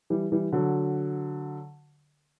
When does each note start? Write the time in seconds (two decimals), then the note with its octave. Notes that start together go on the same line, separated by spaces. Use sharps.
0.10 E3 G3
0.32 E3 G3
0.52 D3 F#3